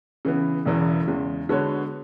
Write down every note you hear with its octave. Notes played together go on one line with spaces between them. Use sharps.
C#3 E3 B3
E1 E2 C#3 E3
E2 C#3 G#3
D3 G#3 B3 F#4 C#5